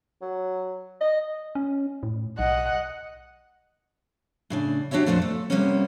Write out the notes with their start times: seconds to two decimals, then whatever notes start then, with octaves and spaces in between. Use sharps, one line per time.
0.22 F#3
1.01 D#5
1.55 C#4
2.03 A2
2.39 B1 D#5 F#5
4.50 A2 C#3 D4
4.91 D4 F#4 G4 C#5 E5
5.06 F2 A#2 A3 D4 C5
5.22 A3
5.50 C3 G3 A#3 B3 C#4